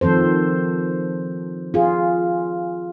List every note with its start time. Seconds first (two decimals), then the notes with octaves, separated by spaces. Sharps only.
0.01 D#3 F3 C4 A4 C5
1.74 F4 G#4